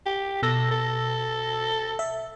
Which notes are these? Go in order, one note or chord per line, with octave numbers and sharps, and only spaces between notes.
G4
B2 A4 E6 A#6
A4
E5